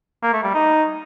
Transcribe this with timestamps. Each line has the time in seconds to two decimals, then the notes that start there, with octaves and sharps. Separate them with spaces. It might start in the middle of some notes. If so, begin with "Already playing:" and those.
0.23 A#3
0.33 A3
0.44 G3
0.54 D#4